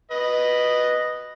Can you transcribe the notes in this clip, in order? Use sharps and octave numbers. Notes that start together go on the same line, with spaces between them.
B4 D#5